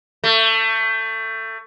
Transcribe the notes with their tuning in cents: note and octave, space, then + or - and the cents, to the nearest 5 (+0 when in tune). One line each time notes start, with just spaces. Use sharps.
A3 +25